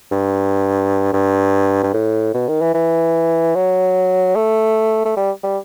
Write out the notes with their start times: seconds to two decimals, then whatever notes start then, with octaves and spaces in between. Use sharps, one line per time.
0.12 G2
1.13 G2
1.83 G2
1.94 A2
2.34 B2
2.48 D#3
2.61 E3
2.74 E3
3.55 F#3
4.36 A3
5.05 A3
5.17 G3
5.44 G3